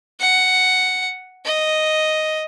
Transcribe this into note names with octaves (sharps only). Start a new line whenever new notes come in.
F#5
D#5